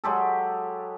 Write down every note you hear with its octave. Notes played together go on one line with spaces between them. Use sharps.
F#3 G#3 G4 A4